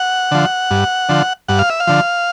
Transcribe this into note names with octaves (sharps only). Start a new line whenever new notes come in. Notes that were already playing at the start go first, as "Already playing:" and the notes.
Already playing: F#5
D3 F3
G2
D3 F3
G2 F#5
F5
E5
F5
D3 F3